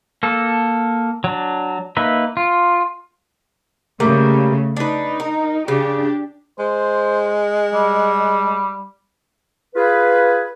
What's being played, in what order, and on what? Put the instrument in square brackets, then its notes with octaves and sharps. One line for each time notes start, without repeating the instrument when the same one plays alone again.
[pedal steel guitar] A#3 A4
F#3 D4
A#3 D#4 B4 E5
F4
[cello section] C#3 A3 [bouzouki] G3 A#3 A#4
[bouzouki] D4 B4 [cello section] D#4
[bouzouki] A#4
[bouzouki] C#3 [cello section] D4 G4
[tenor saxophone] G#3 [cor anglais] C5
[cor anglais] G3
[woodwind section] F4 G#4 B4